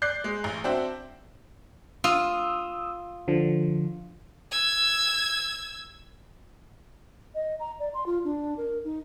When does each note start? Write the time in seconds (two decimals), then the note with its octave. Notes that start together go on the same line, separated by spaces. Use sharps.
0.02 D5 F#6 G6 C7
0.24 G#3
0.44 A1
0.64 C4 D4 F#4 C5 E5 G5
2.04 F4 D#6 E6
3.28 D3 F3
4.51 E6 G#6
7.35 D#5
7.60 A#5
7.79 D5
7.94 C6
8.06 F4
8.25 D4
8.57 A#4
8.84 D#4